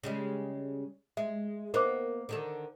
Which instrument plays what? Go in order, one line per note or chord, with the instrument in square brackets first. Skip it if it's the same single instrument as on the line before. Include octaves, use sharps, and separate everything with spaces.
[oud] C#3 G3 G#3
[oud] G#3 [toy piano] E5
[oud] A#3 B3 D#4 [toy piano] A#4 C5 D6
[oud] D3 D#3 A4